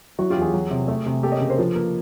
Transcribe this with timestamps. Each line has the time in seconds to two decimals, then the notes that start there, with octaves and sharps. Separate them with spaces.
0.18 F#3 E4 F#4
0.30 F4 G4
0.36 E2
0.41 F#4 G#4
0.54 F#3
0.71 C3
0.88 A3
1.06 C3
1.23 A#3 G4 A4
1.32 C#5 D#5
1.40 C#3
1.49 A#4 C5
1.58 F3 A4 B4
1.75 A#3